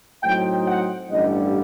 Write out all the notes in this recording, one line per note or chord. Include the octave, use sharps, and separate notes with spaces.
A2 F#3 C4 D#4 G5
F#5
A1 G2 D3 G3 D#5